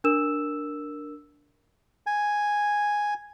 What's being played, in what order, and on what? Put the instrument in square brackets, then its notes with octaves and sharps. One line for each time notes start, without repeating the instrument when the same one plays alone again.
[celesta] D4 A#4 E6 E7
[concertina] G#5